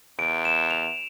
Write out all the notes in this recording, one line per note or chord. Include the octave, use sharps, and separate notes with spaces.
E2 D7
E7
F7